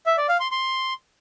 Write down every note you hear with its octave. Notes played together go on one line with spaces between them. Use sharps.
E5
D5
F5
C6
C6